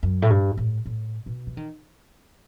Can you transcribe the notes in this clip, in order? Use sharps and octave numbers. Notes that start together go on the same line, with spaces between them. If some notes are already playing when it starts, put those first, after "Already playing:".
F#2
A2
G2
A2
A2
B2
E3
D#3